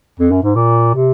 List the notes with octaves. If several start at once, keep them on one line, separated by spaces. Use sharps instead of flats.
F2
F#2
G#2
A#2
C3